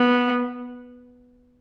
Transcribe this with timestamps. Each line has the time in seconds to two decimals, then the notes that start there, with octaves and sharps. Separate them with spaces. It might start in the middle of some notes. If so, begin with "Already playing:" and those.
Already playing: B3